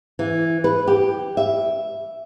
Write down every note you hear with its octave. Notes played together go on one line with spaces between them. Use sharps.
E3
B4
G4
E5